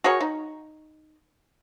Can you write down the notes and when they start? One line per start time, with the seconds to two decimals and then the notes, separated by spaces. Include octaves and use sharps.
0.04 F#4 G#4 A#4 C#5
0.20 D#4